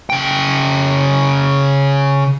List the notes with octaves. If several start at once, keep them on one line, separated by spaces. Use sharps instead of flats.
C#3 G5